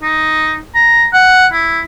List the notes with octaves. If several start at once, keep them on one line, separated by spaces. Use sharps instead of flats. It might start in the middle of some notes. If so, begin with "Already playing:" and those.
D#4
A#5
F#5
E4